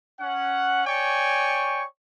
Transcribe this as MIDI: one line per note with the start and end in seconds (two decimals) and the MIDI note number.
0.20 0.82 61
0.20 0.82 78
0.86 1.84 73
0.86 1.84 74
0.86 1.84 79
0.86 1.84 80
0.86 1.84 85